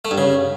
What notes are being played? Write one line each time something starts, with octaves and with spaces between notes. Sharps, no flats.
A3
G2
C#3